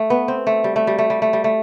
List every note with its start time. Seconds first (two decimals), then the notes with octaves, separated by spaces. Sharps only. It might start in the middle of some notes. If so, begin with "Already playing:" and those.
Already playing: A3
0.10 B3
0.28 C4
0.47 A3
0.64 G3
0.76 A3
0.87 G3
0.98 A3
1.10 G3
1.22 A3
1.33 G3
1.44 A3